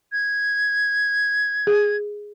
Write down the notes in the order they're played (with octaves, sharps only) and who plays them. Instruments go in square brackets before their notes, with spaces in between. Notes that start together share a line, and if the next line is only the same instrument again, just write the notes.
[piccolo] G#6
[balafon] G#4